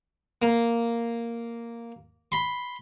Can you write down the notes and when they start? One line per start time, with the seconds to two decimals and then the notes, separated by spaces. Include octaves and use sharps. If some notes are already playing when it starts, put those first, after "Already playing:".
0.42 A#3
2.32 B5 C6